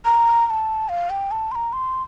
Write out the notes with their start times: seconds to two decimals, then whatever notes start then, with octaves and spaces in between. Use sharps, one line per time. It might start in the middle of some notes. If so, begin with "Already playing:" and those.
0.05 A#5
0.47 A#5
0.50 A5
0.89 F5
1.10 G5
1.31 A5
1.52 C6
1.55 A#5
1.73 C6